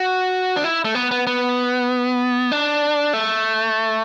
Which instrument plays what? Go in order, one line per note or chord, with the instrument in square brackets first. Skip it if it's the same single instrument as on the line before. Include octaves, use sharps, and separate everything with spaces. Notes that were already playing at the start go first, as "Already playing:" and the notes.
Already playing: [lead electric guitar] F#4
D4
E4
A3
B3
B3
B3
D4
A3